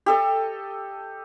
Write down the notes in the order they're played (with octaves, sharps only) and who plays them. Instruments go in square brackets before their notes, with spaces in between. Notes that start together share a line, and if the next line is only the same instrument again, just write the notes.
[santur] G4 A4 D#5